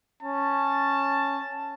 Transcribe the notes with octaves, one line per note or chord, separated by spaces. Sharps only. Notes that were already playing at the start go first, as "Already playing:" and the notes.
C#4 A5